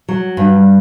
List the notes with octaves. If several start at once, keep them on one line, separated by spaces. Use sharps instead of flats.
F#3
G2